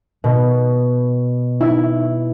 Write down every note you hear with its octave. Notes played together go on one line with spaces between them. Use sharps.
B2
E4